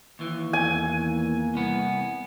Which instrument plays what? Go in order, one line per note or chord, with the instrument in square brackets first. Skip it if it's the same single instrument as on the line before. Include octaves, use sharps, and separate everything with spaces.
[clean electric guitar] D#2 E3
[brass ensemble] E2 A#3 [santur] G#5
[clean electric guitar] C2 B3